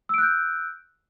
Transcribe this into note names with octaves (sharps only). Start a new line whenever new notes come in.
E6 F#6 G6 D7